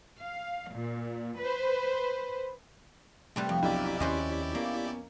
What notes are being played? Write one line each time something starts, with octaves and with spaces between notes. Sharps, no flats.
F5
A#2
B4 C5
C3 G3 A3 B4
F2
B1 D4 E4 G4 D5
D#2 C#4 B4 C5 D#5
A#3 B3